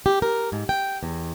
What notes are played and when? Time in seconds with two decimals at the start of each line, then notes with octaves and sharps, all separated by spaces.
0.06 G4
0.22 A#4
0.52 G#2
0.69 G5
1.03 E2